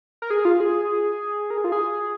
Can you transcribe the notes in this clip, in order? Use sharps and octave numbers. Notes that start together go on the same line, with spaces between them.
A#4
G#4
F4
G#4
A#4
G#4
F4
G#4